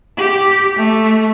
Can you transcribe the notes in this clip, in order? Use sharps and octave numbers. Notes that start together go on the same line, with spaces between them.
G4
A3